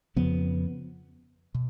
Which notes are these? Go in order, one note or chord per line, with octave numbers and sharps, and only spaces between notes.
F2 C#3 F3 B3
B2